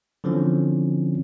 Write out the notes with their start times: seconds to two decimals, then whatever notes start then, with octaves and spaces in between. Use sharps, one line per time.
0.24 D3 E3 F3 C4 C#4